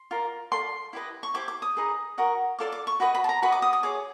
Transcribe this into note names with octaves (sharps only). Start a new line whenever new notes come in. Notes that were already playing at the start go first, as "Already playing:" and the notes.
Already playing: C6
F4 A#4 D5
F4 A4 D5 C6
E4 G4 B4 D#5
C#6
E4 G4 C5 D6
D6
D#6
D#4 G#4 B4
F#4 A#4 D#5
F4 A4 D5 D6
D6
C#6
F#4 B4 D#5 B5
B5
A5
A#5
F#4 B4 D#5 B5
D6
D#6
D#6
G#4 C#5 D6